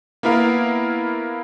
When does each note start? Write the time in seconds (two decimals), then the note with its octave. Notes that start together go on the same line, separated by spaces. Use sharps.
0.23 A#3 B3 E4 A#4 F5